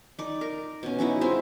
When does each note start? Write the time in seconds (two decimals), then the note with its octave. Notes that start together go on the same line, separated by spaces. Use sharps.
0.19 D#4 D5
0.41 A#4
0.83 B2 C#4
0.99 C#4 D#4 E4 F#4
1.21 G#3 C4 F4 E5